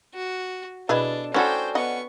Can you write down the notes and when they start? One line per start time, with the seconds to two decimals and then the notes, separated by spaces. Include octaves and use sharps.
0.15 F#4
0.89 B2 D4 E4 G#4 A4 B4
1.34 A3 C#4 E4 F#4 A4 C5 D5 G5
1.75 B3 D#5 F#5 C#6